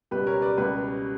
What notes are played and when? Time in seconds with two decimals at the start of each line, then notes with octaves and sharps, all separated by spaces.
0.11 C#2 B2 G3 G4 B4
0.27 A#4 C#5
0.42 B4 D5
0.57 C#2 B2 G3 B4 D5